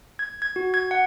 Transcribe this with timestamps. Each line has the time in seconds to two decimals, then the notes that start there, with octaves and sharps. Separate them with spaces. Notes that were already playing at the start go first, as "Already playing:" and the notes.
0.19 G#6
0.42 G#6
0.56 F#4
0.74 G#6
0.91 F#5